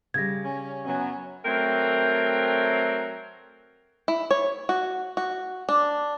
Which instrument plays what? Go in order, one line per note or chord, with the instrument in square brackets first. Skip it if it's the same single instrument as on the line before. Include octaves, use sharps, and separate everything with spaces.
[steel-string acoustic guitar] C#3 G3 [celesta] G#6 A#6
[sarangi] C#4
[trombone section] F#2 F#3 B3 [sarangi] C#4
[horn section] F#3 A3 C4 A#4 G5
[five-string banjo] E4
C#5
F#4
F#4
D4